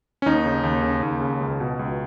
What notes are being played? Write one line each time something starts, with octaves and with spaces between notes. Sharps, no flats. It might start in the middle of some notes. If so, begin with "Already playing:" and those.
C#4
D#2 D#4
C#3
D#2
C#3
D#2
C#3
C#2
B2
C#2